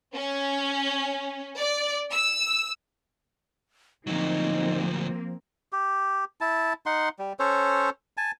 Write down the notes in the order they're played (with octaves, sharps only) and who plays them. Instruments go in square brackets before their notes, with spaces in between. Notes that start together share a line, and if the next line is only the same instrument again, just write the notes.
[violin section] C#4
D5
E6
[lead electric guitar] D2 F#3 [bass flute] F3 [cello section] A#3 C4 [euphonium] D#4
[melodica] G4
E4 A5
D#4 F#5 C6
G3
C#4 A4 C5 C#5
G#5 A5